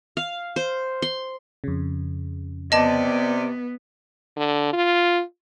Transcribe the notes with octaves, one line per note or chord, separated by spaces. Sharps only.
F5
C5
C6
F2 C#3
C3 B3 D5 D#5 A5
D3
F4